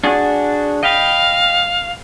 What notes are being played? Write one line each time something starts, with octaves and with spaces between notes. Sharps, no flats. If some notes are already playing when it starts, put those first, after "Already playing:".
D4 F#4 G#4
D#5 F5 G5 B5